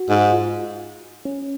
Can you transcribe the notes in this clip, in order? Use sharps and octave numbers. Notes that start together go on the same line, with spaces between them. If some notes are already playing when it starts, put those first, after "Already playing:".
Already playing: F#4
G#2
F4
C#4